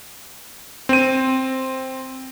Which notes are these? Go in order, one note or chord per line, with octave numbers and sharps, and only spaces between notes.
C4 D#7